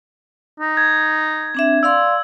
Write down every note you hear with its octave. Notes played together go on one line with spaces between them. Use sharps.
D#4
G#6
C4 D4 E5
D5 F5 C6 E6